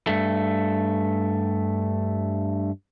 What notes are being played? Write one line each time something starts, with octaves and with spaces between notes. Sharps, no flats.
G2 A3